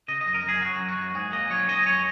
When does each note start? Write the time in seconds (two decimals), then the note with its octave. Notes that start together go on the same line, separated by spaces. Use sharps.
0.08 C#3 D#5
0.21 D#5
0.26 F#2
0.34 A#4
0.44 F#2 G#4
0.61 F#3 F#4
0.79 F#2
0.88 F#4
0.97 F#2
1.14 G#2 G#4
1.32 A#3 D#5
1.50 F#3 C#5
1.68 C#4 D#5
1.86 F#2 C#5